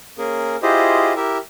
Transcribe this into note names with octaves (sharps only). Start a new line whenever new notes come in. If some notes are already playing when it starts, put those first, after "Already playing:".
A#3 C#4 G#4 A#4
E4 F4 G4 G#4 C5 D#5
E4 G4 A#4 E5